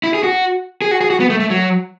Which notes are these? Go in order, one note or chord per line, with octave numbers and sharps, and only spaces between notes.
E4
G#4
F#4
G#4
F#4
G#4
F#4
B3
A3
A3
F#3